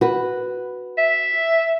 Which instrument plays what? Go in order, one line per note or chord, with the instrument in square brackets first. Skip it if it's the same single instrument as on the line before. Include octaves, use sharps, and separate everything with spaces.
[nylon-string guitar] F#4 B4
[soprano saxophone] E5